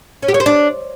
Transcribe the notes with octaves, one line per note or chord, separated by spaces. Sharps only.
C#4
G4
C#5
C5
D4